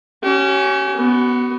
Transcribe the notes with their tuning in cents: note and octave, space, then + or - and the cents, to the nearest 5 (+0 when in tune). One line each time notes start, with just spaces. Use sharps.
C#4 +0 G4 -45
B3 +0 F#4 +35